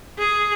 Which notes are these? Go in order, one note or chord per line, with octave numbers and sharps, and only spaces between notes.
G#4